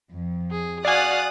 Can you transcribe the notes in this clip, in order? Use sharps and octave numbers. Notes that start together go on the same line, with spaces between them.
F2
G#4
F#4 D5 F5 G#5 D#6 F#6 A6